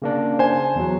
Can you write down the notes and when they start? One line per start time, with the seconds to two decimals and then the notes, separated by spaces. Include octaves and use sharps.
0.02 C#3 A#3 D4
0.39 C5 G#5
0.76 E2 F#3